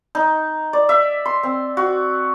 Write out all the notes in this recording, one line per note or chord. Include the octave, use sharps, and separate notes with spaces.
D#4
D5
E5
C6
C4
F#4